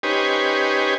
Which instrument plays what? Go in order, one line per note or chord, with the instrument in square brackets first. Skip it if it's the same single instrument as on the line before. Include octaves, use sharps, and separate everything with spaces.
[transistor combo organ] C#4 D#4 G4 B4 C5 G#5